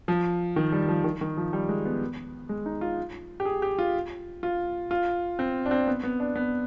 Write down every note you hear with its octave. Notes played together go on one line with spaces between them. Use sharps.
F3
D#3
G3
F3
D#3
D#3
F3
G3
G#3
B3
G#3
D#4
F4
G4
G#4
G4
F4
F4
F4
C4
D4
C4
B3
B3
D4
B3